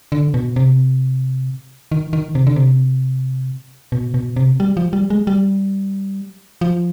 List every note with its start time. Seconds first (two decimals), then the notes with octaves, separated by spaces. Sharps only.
0.12 D3
0.34 B2
0.56 C3
1.92 D#3
2.13 D#3
2.35 C3
2.47 D3
2.56 C3
3.92 B2
4.14 B2
4.36 C3
4.60 G3
4.77 F3
4.93 G3
5.10 G#3
5.27 G3
6.61 F3